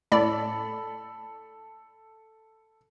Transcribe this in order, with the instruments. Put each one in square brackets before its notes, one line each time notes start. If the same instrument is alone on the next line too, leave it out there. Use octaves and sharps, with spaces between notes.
[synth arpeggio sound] A2 D5 [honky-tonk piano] A4 B5